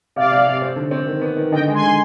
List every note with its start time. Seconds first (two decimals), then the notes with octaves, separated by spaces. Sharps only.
0.16 C3 D5 F5
0.32 C3
0.47 C3
0.62 C4
0.76 D3
0.91 C4
1.07 D#3
1.21 B3
1.37 D#3
1.52 D3 D#5 G5
1.67 G#3
1.74 G#5 C6
1.82 D3